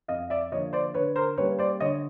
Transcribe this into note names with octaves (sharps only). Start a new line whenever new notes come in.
F2 D#5 F5
D5 E5
D3 F3 A#3 C#5 D#5
C5 D5
D3 B4 C#5
A#4 C5
G3 A#3 C#4 B4 C#5
C5 D5
D3 C#5 D#5